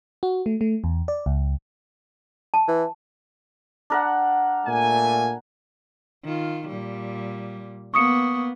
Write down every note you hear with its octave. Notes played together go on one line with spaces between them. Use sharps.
F#4
A3
A3
E2
D5
C#2
A5
E3
D4 A#4 F#5
A#2 A3 G#5
D#3 F4
A#2 G3
A#3 B3 C#6 D#6 C#7